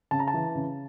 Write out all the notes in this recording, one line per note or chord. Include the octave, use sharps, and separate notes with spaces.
C#3 A5
A#5
A5
E3
C#3